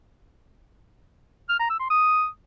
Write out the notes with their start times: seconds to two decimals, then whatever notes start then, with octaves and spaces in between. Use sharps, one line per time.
1.49 F6
1.59 A#5
1.69 E6
1.80 C6
1.90 D#6